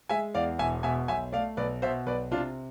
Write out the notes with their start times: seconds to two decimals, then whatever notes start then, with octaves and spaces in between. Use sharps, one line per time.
0.09 G#3 E5 G#5
0.34 E2 D5 F5
0.59 E1 E5 G#5
0.83 B2 E5 G#5
1.08 B1 E5 G#5
1.32 A3 D5 F5
1.57 B1 B4 D5
1.82 B2 C5 E5
2.06 B1 B4 D5
2.31 C3 D4 F4